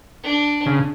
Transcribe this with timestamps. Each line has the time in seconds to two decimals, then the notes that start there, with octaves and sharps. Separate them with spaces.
0.23 D4
0.66 C#3